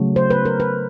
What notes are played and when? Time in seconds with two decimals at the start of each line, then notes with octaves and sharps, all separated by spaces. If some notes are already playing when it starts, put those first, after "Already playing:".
Already playing: C#3 F#3 A3
0.16 C5
0.30 B4
0.45 A#4
0.60 B4